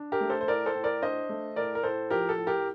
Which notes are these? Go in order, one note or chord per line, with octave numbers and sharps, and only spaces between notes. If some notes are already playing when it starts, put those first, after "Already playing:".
Already playing: D4
G4 A#4
A3
A4 C5
C5
A2 A#4 D5
A4 C5
A2
A#4 D5
D4 C5 D#5
A3
A2 A#4 D5
A#4
A2 A4 C5
F3 G4 A#4
A4
A2
G4 A#4